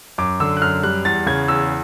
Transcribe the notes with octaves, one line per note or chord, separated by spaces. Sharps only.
F#2 D6
D3 E6
F#6
F#2 F6
G3 F#6
E2 A6
C#3 G#6
E2 E6